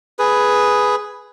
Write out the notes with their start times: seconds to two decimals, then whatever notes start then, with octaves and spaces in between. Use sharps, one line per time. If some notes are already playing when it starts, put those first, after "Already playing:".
0.19 G#4 B4